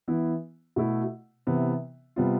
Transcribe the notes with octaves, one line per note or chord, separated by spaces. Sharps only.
E3 B3 E4
B2 A3 E4
C3 E3 B3 E4
C3 G3 B3 F4